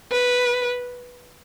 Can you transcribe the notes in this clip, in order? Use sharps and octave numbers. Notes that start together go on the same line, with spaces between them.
B4